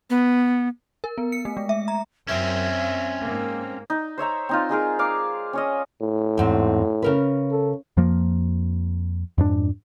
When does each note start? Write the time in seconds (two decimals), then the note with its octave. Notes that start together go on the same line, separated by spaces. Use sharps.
0.10 B3
1.04 A#4
1.18 B3
1.32 C#7
1.45 A3
1.57 G#3
1.69 E5
1.88 A#5
2.28 F#2 C4 C#4 E5
3.22 G#2 A#3
3.90 D#4
4.18 C5 C#5 E5 A#5
4.49 C4 D#4 F4
4.69 G#3 D#4 G#4 A#4
4.99 F5 A#5 D6
5.53 C#4 C#5 D#5
6.02 A2
6.37 E2 G#2 C4
7.02 C#3 A#4 B4
7.52 A4
7.97 F2 F3 A#3
9.38 F2 G#2 D4